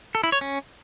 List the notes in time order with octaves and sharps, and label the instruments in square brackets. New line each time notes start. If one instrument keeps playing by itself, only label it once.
[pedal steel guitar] A4
E4
C#5
C#4